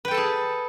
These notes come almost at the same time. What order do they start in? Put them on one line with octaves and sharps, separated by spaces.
B4 G5 A4 A5 G#4